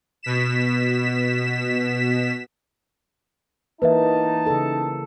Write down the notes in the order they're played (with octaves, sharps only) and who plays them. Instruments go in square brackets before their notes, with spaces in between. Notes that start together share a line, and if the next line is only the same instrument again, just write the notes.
[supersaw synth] B2 B6 E7
[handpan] E3 A#3 [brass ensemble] D#4 A5 [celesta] B4 E5
[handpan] C#3 A4